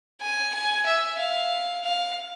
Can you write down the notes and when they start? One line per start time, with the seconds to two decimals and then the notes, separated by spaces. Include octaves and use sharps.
0.21 G#5
0.54 G#5
0.86 E5
1.18 F5
1.84 F5